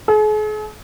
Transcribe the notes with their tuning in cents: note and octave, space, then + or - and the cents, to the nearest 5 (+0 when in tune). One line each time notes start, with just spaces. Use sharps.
G#4 +45